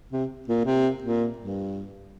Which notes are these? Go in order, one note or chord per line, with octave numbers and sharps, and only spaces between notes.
C3
A#2
C3
A#2
G2